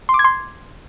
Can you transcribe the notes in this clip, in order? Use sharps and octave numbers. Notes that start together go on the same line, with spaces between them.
C6
D6
G#6
C6